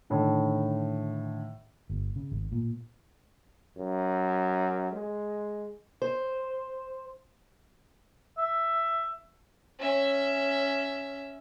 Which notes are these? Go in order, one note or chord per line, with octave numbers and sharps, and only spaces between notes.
A2 D3 D#3
G1
C#3
G#1
A#2
F#2
G#3
C5
E5
C#4 E5